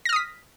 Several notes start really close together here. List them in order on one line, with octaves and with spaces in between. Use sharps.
A#6 F6 D#6 B6